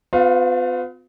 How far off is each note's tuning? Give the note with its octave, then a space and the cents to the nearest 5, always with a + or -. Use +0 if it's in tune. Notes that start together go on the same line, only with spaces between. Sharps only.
B3 +45 F4 +40 F5 -10